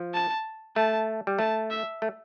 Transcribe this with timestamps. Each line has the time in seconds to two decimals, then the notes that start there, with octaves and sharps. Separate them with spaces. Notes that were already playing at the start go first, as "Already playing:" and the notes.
Already playing: F3
0.14 A5
0.76 A3 A5
1.27 G3
1.39 A3 A5
1.71 E5
2.02 A3